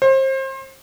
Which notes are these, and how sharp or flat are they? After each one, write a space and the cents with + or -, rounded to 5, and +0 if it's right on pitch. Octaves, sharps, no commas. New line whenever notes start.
C5 +30